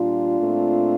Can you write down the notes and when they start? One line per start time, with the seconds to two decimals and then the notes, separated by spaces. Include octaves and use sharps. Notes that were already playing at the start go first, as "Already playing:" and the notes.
Already playing: A#2 G3 D4 F4
0.39 A#2 A3 C4